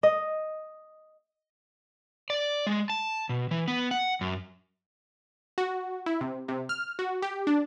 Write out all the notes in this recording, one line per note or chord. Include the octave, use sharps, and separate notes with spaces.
D#5
D5
G#3
A5
B2
E3
B3
F#5
F#2
F#4
E4
C3
C3
F6
F#4
G4
D4